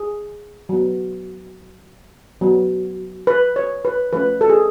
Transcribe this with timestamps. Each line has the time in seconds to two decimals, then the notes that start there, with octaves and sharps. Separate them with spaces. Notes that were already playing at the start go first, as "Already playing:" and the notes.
Already playing: G#4
0.69 F#3 B3
2.41 F#3 B3
3.27 B4
3.56 C#5
3.85 B4
4.13 F3 A3 C#4 B4
4.41 A4
4.49 G#4